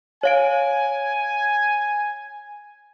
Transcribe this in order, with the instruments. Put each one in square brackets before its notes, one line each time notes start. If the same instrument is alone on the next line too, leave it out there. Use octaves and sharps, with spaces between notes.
[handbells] C#5 F5 D7 [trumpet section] G#5